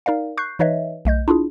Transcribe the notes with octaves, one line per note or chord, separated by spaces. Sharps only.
D#4 A#4 D5 F5
C#6 F#6 G6 C7
E3 D#4 B4 C#5 D#5 E5
B1 A3 D#5 G6
D4 E4 F4 G#4